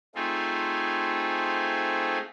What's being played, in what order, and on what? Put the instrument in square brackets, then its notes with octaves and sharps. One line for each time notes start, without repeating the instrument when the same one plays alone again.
[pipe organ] A3 C4 D#4 F4 G#4